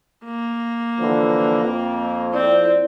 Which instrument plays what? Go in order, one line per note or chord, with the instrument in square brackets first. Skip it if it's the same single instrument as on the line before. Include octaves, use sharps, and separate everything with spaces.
[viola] A#3
[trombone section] D3 E3 F3
F2
[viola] C4 [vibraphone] E4 D5